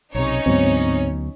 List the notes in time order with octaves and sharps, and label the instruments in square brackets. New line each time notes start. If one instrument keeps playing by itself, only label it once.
[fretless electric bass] B1 C3 [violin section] C#4 D#4 C#5
[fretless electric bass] D2 F#3 B3 [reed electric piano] G#2 C4